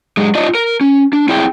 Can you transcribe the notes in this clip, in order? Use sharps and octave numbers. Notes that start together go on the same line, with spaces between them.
F#2 G#3
D4 F4 D5 D#5
A#4
C#4
D4
C4 E4 G#4 D5 G5